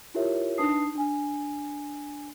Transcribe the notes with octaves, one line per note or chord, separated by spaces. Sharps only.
E4 F4 G4 A#4 C#5 E5
D4 D#4 B4 A5 D#6 C7
D4 G#5